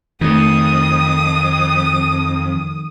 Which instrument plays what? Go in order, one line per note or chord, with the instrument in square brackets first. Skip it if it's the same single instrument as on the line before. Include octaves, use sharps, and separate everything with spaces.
[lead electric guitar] F2 [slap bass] D#3 A3 [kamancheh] D#6